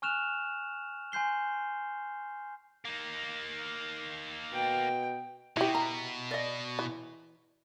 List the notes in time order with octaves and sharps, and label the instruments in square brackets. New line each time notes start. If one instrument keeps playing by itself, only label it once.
[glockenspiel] G#5 C#6 F6 F#6 E7 F7
G#5 C6 G6 C7 G7
[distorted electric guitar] A#3 D#4
[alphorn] B2 [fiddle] G5
[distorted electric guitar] B2 [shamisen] E4 G4
[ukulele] A#5
D5 D#5
[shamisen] E3